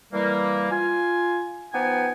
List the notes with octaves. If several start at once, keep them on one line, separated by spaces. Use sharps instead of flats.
E3 G3 A#3
F4 G#5
F3 B3 D#4 B4 G5 G#5